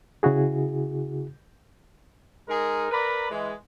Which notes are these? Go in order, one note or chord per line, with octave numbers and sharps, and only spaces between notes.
C#3 E4 F#4 G#4
G#3 D#4 G#4 A#4
A#4 B4 D5 A#5 B5
E3 G#3